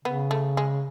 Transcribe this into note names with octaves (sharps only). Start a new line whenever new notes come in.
C#3 B3
A3
G#3